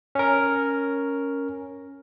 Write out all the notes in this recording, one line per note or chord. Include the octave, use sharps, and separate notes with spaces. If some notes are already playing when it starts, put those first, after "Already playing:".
C#4 A#4